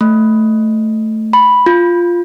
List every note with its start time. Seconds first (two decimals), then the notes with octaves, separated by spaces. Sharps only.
0.01 A3
1.33 B5
1.66 F4